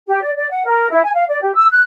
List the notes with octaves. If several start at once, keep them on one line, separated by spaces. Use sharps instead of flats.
G4
D5
D5
F#5
A#4
E4
G#5
F5
D5
G4
E6
F#6